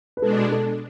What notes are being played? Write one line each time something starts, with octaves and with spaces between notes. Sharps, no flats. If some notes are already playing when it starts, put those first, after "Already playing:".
B4
B2 G#3 D4 A4
A4